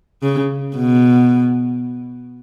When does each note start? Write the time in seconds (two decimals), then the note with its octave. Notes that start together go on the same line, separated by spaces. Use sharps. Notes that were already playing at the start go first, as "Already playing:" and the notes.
0.22 C#3
0.76 B2